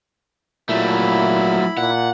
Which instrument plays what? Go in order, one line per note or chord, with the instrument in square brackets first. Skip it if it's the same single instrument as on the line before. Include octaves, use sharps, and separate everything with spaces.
[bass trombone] A#2 [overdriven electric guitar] F#3 A3 [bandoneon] E4 B5
[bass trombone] A#2 [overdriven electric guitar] F#5